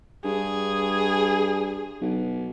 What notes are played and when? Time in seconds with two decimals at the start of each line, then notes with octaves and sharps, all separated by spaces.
0.25 G2 G#4
2.01 B1